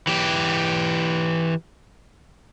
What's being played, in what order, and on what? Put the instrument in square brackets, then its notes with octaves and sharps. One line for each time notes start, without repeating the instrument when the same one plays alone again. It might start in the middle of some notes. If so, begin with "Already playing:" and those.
[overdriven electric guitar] E3 G4